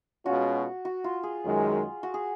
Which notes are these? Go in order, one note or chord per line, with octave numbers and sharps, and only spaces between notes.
B2 G#3 C#4 F4 F#4
F#4
F4
G#4
F#2 D#3 G#3
F#4
G#4